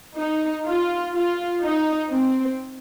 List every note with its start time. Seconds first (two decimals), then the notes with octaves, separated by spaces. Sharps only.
0.17 D#4
0.66 F4
1.14 F4
1.62 D#4
2.11 C4